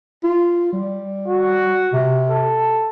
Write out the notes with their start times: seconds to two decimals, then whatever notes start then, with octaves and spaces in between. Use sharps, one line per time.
0.24 F4
0.73 G3
1.28 F#4
1.93 C3
2.30 A4